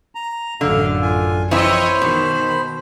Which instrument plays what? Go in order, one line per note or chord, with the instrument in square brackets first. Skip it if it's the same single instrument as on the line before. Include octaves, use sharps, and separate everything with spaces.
[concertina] A#5
[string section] A1 F#2 [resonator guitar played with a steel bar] D3 [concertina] F5
[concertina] F4 G#5
[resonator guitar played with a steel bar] F2 E3 E4 [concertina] C5 B5 [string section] C#5 D#5
[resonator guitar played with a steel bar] B2 [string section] D#3